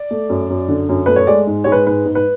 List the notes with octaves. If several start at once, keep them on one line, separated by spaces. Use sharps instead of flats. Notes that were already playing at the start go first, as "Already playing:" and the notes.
Already playing: D5
A3
F#2
F#2
D3
F#2
A3 B4
C#5
G#3 D5
G#2
G#3 C#5
B4
G#2 B4
G#2
B4